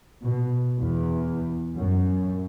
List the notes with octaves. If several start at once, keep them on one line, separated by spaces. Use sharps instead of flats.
B2
E2
F#2